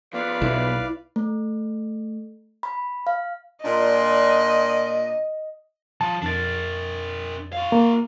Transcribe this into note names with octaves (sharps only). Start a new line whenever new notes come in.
F3 B3 B4 D5 F5
B1 E4
A3
B5
F5
A#2 D4 D#5
F3 A5
F2 D4 A#4 A6
F#4 F5
A#3